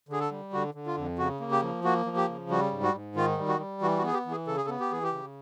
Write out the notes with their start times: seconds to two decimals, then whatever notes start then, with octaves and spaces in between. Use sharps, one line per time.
0.09 D3 G#4
0.20 A4
0.31 G3
0.53 D3 F#4
0.74 D3
0.86 F4
0.97 F2
1.18 C#3 F#4
1.40 A#3
1.51 G4
1.62 F3
1.84 A#3 F#4
2.06 F3
2.17 G4
2.29 C#3
2.49 G3 F#4
2.71 G#2
2.83 F#4
2.94 G#2
3.16 D#3 F4
3.38 G3
3.48 F#4
3.59 G3
3.81 E3 F#4
3.98 F#4
4.03 B3 G#4
4.14 G4
4.26 E3
4.31 G#4
4.47 C#3 A4
4.57 G#4
4.65 A4
4.69 B3
4.80 G4
4.91 E3 G#4
5.03 G4
5.13 C#3